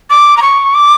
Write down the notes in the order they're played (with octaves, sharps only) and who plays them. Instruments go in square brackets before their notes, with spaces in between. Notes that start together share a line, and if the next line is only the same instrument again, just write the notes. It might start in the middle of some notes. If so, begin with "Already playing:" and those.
[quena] D6
A#5
C#6
D6